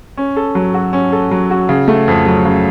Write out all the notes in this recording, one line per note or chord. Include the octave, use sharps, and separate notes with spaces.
C#4
A4
F#3
F#4
C#4
A4
F#3
F#4
C#3
A3
F2
F#3
C#3